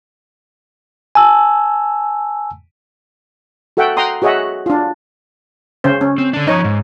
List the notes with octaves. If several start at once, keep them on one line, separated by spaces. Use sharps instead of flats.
G#5 A5 E6
F#4 A4 E5 F#5 G5
F#5 G5 A#5 C6 D#6
F#4 G#4 C#5 D#5 E5 F#5
D4 F4
C#3 C#4 C5
C#4
C4
D3 D4
F3 D#4 C#5 D#5
G#2